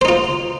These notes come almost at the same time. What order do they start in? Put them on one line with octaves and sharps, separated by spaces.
C5 D#4 F4